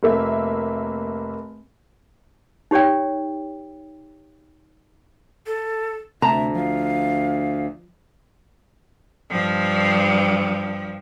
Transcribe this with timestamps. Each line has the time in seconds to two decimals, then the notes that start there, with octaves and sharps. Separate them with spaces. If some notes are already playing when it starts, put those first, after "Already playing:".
0.03 F1 A#3 E5
2.71 D#4 G4 C#5 D5 G5
5.46 A4
6.22 D2 C3 A3 E5 A5 A#5
6.55 F3 F5
9.31 G2 F3